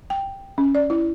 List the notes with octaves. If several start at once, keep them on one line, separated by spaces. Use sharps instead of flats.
G5
C#4
D5
E4